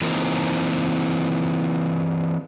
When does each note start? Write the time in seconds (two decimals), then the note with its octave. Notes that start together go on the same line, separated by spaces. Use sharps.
0.01 E3 A#3 C4 D#4 F4 A#4